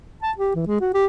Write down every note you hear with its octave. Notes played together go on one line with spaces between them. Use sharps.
A5
G4
E3
G#3
F#4
G4